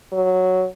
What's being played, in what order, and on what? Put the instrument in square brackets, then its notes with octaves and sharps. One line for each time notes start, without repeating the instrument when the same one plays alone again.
[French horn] F#3